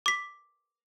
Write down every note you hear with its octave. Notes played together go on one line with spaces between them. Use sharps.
D6 B6